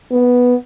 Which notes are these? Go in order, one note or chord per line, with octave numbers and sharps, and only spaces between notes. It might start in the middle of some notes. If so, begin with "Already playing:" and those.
B3